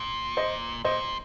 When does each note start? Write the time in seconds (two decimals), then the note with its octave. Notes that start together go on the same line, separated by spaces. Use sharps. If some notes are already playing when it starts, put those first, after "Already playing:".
Already playing: A#2
0.37 C5 D#5
0.85 A#2 C5 D#5